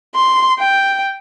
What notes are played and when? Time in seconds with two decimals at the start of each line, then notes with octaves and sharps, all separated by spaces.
0.15 C6
0.59 G5